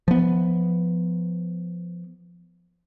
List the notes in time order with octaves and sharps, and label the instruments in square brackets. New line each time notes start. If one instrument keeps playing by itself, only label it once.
[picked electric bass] F3 B3